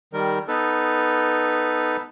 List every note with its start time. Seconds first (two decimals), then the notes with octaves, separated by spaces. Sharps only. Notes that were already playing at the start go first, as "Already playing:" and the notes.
0.13 D#3 G3 A#4
0.48 B3 D#4 A4 B4